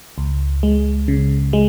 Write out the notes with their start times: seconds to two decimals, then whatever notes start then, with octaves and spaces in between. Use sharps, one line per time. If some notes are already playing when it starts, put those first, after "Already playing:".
0.18 C#2
0.63 G#3
1.08 C#3
1.53 G#3